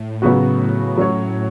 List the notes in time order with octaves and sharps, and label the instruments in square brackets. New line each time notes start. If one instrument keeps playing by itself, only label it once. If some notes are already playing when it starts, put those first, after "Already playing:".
Already playing: [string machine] A2
[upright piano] C#3 F#3 B3 F#4
[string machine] A2 [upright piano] F#3 C#4 F#4 C#5